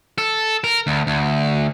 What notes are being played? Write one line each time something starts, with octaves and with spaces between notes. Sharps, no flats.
A4
A#4
D2
D2